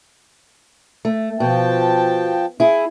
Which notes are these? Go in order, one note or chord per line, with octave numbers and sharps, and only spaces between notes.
A3
B2 F3 G5 A5
E4 G#4